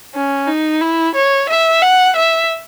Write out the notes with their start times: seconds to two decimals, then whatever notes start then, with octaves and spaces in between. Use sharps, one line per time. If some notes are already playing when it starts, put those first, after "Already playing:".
0.15 C#4
0.47 D#4
0.81 E4
1.15 C#5
1.49 E5
1.82 F#5
2.16 E5